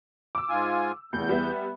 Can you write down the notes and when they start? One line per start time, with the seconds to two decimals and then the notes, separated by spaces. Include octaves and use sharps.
0.35 D6 E6
0.49 G#2 F4 G#5
1.13 F1 E2 G6
1.29 G3 B3 E5